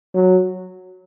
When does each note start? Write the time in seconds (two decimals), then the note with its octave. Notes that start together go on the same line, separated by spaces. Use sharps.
0.14 F#3